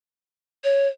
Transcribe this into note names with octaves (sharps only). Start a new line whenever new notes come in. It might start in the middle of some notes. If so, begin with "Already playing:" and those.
C#5